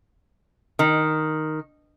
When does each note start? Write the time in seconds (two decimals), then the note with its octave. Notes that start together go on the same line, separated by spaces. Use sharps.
0.79 D#3